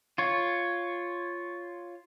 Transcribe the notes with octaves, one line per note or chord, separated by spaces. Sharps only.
F4 C#5